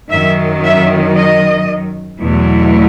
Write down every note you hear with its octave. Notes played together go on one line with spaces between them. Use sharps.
F#2 D#3 F#3 E5
E5
D#5
E2 B2 F#3 A3 E4